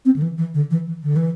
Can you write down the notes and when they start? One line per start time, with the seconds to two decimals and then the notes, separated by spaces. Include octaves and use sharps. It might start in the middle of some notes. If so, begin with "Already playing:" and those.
0.05 C4
0.16 D3
0.22 E3
0.38 E3
0.54 D3
0.71 E3
0.87 E3
1.03 D3
1.16 E3